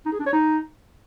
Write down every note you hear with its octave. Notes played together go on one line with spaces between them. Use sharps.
D#4
G#4
D4
C#5
D#4